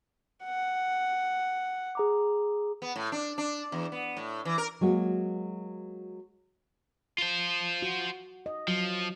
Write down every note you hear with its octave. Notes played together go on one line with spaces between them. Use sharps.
F#5
G#4 A#5 D6
B3
A2
D4
D4
E2
B3
A2
E3
A#4
F#3 G#3 A#3 F#4
F4 C5
F#4
D#5
F3 F#3